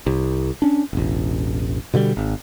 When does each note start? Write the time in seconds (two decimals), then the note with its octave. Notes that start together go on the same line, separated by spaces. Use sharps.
0.07 C2
0.62 C#4 D4
0.93 E1 A1
1.94 B2 D3 F3 G3
2.17 G#1